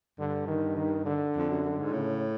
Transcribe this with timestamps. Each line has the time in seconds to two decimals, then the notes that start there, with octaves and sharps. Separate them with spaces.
0.19 G2 D3
0.48 D#3
0.77 D#3
1.06 D3
1.35 F2
1.49 F#2
1.64 F#2
1.78 G#2
1.93 A2 C#3